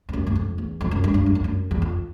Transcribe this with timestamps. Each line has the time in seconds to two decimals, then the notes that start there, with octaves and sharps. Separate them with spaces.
0.09 F2
0.13 F#2
0.27 F#2
0.35 F2
0.58 E2
0.81 F2
0.91 F#2
1.04 G2
1.14 G2
1.26 F#2
1.35 G2
1.44 F#2
1.71 E2
1.82 F2